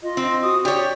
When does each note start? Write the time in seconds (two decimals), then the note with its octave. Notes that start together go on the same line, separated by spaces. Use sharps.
0.03 F4 D#5
0.17 C4
0.43 F#4 D#6
0.65 G4 C#5 D5